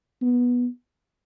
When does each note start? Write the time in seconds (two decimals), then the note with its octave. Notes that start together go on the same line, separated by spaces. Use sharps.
0.22 B3